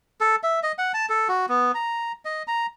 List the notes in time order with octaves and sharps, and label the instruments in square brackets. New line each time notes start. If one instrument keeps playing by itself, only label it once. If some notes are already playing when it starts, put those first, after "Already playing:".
[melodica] A4
E5
D#5
F#5
A5
A4
F#4
B3
A#5
D#5
A#5